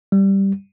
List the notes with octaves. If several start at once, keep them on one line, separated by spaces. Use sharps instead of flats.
G3